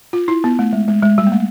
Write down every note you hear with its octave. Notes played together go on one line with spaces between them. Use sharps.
F4
E4
B3
A3
G#3
G#3
G#3
G3
A#3
A3